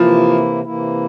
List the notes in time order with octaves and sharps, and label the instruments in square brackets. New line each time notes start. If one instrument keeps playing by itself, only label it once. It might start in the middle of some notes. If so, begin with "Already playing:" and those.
Already playing: [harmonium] C3 E3 A#3 E4 [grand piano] F3
[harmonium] C3 E3 A#3 E4